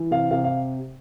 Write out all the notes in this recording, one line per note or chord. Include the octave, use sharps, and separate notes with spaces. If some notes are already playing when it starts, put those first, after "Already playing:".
Already playing: E3
C3 F5
C3 F5
F5